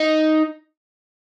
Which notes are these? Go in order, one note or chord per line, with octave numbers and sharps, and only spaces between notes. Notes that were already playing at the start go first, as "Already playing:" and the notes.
Already playing: D#4